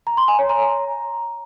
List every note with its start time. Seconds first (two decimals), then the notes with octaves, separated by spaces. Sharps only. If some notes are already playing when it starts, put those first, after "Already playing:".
0.07 A#5
0.17 C6
0.28 G#5
0.39 C#5
0.49 A#5